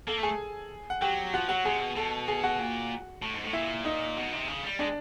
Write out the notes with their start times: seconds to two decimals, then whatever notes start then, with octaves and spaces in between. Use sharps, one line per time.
0.07 A#3 A4 A5
0.18 A3
0.23 G#4 G#5
0.90 F#5
1.01 F#3 G4 G5
1.33 F3 F#4 F#5
1.49 F#3 F#4 F#5
1.65 C3 G#4 G#5
1.80 B2
1.96 B2 A4 A5
2.28 G#4 G#5
2.43 F#4 F#5
2.59 A#2
3.22 A2
3.33 G#2
3.43 A2
3.53 A#2 E4 E5
3.85 D#4 D#5
4.16 B2
4.32 C3
4.48 C#3
4.64 G3
4.79 G#3 D4 D5